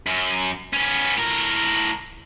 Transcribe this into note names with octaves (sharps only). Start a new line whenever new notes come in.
F#2
B3 C#4
A2 A#4